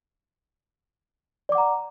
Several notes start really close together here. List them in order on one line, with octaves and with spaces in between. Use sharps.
D5 D6 F#5 A#5